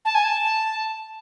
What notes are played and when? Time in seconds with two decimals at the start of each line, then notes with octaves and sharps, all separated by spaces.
0.05 A5
0.15 G#5
0.24 A5